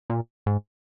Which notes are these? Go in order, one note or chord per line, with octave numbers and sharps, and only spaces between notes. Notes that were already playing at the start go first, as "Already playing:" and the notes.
A#2
G#2